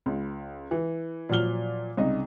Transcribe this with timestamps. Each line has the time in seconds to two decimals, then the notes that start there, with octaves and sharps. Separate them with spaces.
0.06 C#2
0.71 E3
1.29 A#2 F3 F#3 F6 G7
1.97 C2 C#3 D#4 D#5